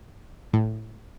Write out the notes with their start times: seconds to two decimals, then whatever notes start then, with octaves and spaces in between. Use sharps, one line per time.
0.53 A2